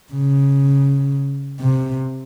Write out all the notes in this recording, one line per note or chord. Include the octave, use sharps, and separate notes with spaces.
C#3
C3